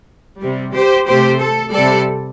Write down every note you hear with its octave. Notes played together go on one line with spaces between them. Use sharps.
C3 G3
G4 C5
C3 A3 G4 C5
A4
C3 G3 A4 D5